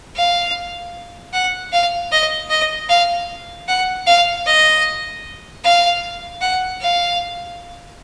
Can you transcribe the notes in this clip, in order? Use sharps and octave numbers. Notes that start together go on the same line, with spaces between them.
F5
F#5
F5
D#5
D#5
F5
F#5
F5
D#5
F5
F#5
F5